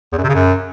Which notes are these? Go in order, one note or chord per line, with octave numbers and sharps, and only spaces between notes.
E2
F#2
C3
C#3
F#2